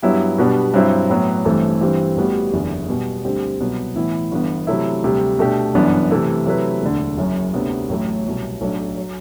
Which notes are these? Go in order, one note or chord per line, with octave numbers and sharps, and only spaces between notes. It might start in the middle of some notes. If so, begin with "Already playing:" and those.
G2 F#3 B3 E4 G4
B2 G3 B3 D4
G2 F#3 C4 E4
A2 F#3 B3
A1 G2 E3 A3 C4
G2 E3 G3 C4
A1 A2 G3 B3 F#4
F#1 E2 D3
B2 G3 B3
D2 D3 G3 C4 G4
C2 B2 F#3 B3
A2 E3 B3 E4
G1 G2 E3 B3
C3 F#3 A3 E4
D2 C3 G3
B2 A3 D4 G4
G1 F#2 E3 B3 D4
C3 E3 A3 E4
C3 F#3 A3 E4 B4
E1 D2 D3
F#1 F#2 F#3
D2 C3 F#3 B3 D4
A1 A2 F#3 A3
C2 B2 F#3
B1 A2 F#3 A3 D4
F#3